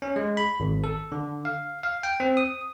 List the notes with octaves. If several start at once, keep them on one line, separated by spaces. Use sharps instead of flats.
C#4
G#3
B5
G#1
A4
D3
F5
F5
G5
C4
D#6